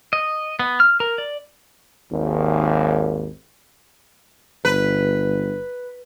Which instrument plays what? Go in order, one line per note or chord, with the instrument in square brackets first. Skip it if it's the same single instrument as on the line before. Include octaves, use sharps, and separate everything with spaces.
[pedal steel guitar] D#5
B3
F6
A#4
D5
[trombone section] G#1 D#2
[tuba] G1 [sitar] B4